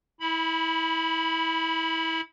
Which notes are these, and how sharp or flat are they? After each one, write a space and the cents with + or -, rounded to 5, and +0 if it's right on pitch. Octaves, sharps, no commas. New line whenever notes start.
E4 -25 B5 +0